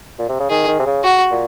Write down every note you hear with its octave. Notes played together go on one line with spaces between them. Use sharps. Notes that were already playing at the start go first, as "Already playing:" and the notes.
A#2
C3
C#3
D#3 G#4
D#3
C3
C#3
F#4
A#2